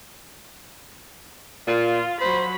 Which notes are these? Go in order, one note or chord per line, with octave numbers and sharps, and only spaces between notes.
A#2 F4
F#3 C5 B5